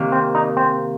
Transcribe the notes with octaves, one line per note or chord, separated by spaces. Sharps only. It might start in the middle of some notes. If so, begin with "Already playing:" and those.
Already playing: C3 D#3 A#3
C4
D#4
C4